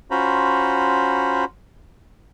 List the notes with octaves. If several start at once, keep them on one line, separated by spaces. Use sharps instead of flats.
C#4 F4 F#4 C5 A#5 B5